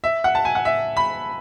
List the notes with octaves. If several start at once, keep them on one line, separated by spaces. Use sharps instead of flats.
E5
F#5
A5
G#5
F#5
E5
B5